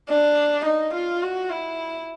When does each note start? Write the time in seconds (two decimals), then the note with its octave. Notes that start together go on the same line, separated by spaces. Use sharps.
0.09 D4
0.65 D#4
0.94 F4
1.22 F#4
1.50 E4